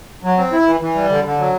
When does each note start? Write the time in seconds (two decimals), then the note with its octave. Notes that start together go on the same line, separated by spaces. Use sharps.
0.23 F#3
0.37 C4
0.52 E4
0.66 E3
0.81 E3
0.95 G3
1.10 D3
1.24 D3
1.38 F#3